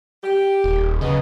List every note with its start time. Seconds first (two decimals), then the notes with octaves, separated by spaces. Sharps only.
0.24 G4
0.64 D#1
1.01 C#3 F#3 B3 D#5